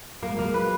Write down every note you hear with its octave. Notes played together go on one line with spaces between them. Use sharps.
F#3 A#3
G#3
F#3 A#3
B4